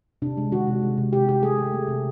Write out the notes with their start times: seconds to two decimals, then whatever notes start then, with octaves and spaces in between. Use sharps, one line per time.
0.22 C3 D4
0.37 G#3
0.52 D#3 F#4
0.67 C3
0.83 G#3
0.98 C3
1.13 C3 G4
1.28 C3 G4
1.43 A3 G#4
1.58 A3
1.74 A3
1.88 C3